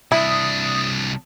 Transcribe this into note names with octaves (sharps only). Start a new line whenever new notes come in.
C2 D4 E4 D#6